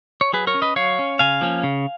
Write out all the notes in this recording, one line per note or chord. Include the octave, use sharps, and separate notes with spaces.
C#5
F#3 G#4 B4
A#4 C#5
C#4
B4 D#5
F#3 C#5 F5
C#4
C#3 F5 G#5
F3 A#3 C#4
C#3